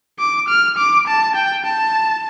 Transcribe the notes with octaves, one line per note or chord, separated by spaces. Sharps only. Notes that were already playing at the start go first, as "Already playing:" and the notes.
D6
F6
D6
A5
G5
A5